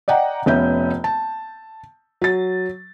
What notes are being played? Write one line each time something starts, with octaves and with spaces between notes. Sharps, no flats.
D5 D#5 F#5 G5 A#5
F1 B3 C#4 E5 G6
A5
F#3 A6